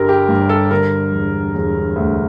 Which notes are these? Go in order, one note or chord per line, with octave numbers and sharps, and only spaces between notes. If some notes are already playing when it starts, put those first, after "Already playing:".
Already playing: G1 D3 G3 A#4
G4
G2
A4
D3 A#4
E1
E1
D2